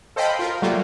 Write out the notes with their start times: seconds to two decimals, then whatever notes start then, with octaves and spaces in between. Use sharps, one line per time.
0.16 A4 C5 D#5 F5 G5 B5
0.39 F4 A#4
0.62 F#3 G3 A3 A#3 F4